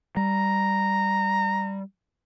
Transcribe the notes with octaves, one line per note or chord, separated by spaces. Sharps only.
G3 A#5